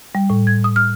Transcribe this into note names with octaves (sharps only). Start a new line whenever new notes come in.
G3
A2
G#6
D#6
F6